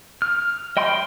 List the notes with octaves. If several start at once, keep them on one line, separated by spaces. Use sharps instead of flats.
F6
D#5 G5 B5 C6